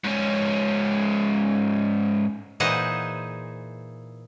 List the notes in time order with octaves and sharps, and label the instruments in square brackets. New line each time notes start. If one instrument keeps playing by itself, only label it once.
[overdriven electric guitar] G#2 C#4
[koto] A#2 E3 D#4 G#4 C5 F#5